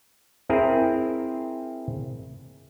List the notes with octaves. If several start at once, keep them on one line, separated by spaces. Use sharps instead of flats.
C4 E4 G#4 A#4